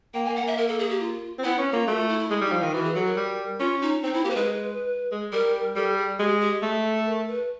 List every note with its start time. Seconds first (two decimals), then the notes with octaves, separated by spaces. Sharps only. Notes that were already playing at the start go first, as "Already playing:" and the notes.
0.14 A#3 G5
0.25 G#5
0.29 A#3
0.36 F#5
0.43 A#3 E5
0.58 A#4
0.69 A4
0.79 G#4
0.90 G4
1.00 F4
1.39 C4
1.44 B3 E4
1.58 C#4
1.73 A#3 F4
1.87 A3 F#4
1.98 F4
2.09 E4
2.19 E4
2.30 G#3 E4
2.41 G3
2.45 D#4
2.52 F3
2.59 D#3 F4
2.73 E3 F#4
2.84 G#4
2.95 F#3 A4
3.06 A#4
3.17 G3
3.60 C#4 F4
3.82 D#4
4.03 C4 D#4
4.14 C4 E4
4.25 A#3 G4
4.30 C5
4.36 G#3 B4
5.12 G#3
5.32 G3 A#4
5.76 G3 A4
5.98 G#4
6.19 G#3 G4
6.41 G4
6.62 A3 G#4
6.84 A4
7.05 A#4
7.27 B4